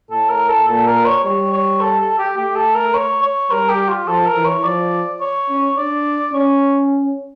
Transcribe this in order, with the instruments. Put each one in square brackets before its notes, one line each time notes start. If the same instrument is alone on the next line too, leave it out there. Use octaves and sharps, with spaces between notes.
[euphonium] A2 [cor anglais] A4
[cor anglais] A#4
A4
[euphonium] A#2 [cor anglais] A4
[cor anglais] A#4
C#5
[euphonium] G3 [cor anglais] C#5
[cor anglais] C#5
A4
A4
G4
[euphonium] A3 [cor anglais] G4
[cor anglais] A4
A#4
C#5
C#5
[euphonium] G3 [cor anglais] A#4
[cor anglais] G4
F4
[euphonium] F3 [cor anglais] A4
[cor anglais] A#4
[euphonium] E3
[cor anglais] C#5
[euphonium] F3 [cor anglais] D5
[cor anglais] C#5
[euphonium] C#4
[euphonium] D4 [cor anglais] D5
[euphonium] C#4 [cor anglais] C#5